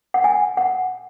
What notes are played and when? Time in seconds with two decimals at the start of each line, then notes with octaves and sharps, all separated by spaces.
0.14 F#5
0.24 G#5
0.57 F#5